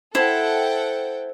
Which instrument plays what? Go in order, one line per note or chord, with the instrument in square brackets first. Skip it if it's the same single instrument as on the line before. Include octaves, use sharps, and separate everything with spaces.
[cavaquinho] E4 [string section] A4 F#5 G5 [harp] C5